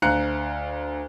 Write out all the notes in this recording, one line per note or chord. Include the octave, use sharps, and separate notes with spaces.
D2 F5 A#5 F#6 C#7